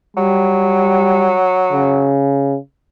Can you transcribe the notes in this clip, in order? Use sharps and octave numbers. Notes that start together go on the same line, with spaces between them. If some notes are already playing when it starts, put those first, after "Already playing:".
F#3 G3
C#3